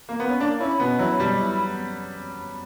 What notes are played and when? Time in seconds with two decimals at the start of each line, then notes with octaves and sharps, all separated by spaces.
0.09 A#3
0.20 B3
0.29 C#4
0.40 A#3 D4
0.60 C#4 E4
0.80 B2 B3
0.99 F#3 E4
1.19 B2 G3
1.40 E4